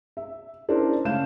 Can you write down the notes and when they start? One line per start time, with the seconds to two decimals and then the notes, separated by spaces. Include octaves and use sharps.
0.17 E5
0.69 C#4 D4 E4 A#4 C5 D5
1.05 C#3 A3 F5 G6 E7